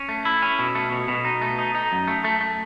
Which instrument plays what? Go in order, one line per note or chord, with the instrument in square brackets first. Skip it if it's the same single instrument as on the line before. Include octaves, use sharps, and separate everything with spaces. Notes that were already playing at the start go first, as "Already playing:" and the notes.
Already playing: [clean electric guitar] C#4
A3
E4
C#4
B2
A3
B2
B2
D#4
A3
D#4
D#4
F#2
A3
A3
A3